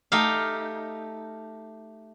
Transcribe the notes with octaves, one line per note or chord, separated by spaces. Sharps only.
A3 D#4 G4 F5